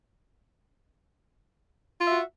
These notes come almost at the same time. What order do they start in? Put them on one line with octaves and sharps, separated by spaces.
F4 E5 F#4